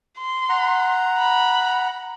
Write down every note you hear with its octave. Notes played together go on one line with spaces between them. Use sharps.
C6
F#5 A#5
B5